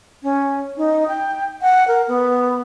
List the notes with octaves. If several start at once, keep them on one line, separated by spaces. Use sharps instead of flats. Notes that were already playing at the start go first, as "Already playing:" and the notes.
C#4
D#4
G5
F#5
A#4
B3